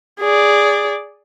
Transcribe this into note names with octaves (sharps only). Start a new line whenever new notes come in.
G#4 D5